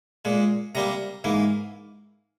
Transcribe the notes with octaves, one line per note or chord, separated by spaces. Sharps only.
A#2 G#3
C3 G3 A#3 A#5
G#2 E3 A#3